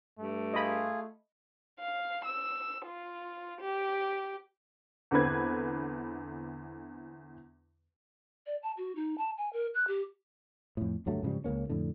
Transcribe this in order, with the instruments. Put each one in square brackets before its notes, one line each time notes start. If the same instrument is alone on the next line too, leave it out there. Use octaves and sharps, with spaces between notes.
[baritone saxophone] G2 [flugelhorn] A3
[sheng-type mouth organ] F4 G#4 [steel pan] D#5 B5
[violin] F5
E6
F4
G4
[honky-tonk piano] E2 D3 C4 B4 G#6
[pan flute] D5
A5
F#4
D#4
A5
G#5
A#4
F#6
G4
[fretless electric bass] F2 A2
D2 G2 F#3 A3
G#2 C#3 F3 G3
C#2 C#3 A#3 C#4
F2 A2 D3